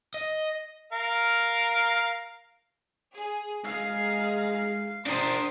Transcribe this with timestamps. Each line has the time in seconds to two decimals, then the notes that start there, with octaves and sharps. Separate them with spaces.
0.14 D#5
0.92 A#4 F5
3.15 G#4
3.64 G#3 G#4 F5 A#5 C7
5.06 D4 A#4 C5 D#6 C7